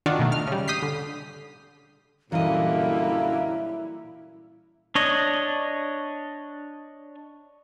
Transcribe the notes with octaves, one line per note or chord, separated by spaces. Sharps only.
D#3 D4 F4 F#4
B2 D#3 A3
F6
C#3 G3
D#6 G6 B6 C7
D3
F#2 A#2 D3 E3 G3 A#3 E4 D#5
D4 C#5 D#5